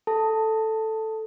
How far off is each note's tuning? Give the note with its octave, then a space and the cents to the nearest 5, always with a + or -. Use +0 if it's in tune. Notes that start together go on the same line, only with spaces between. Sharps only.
A4 +0 A5 +10